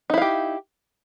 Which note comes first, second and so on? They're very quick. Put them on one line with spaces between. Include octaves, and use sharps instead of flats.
D#4 E4 F5 G4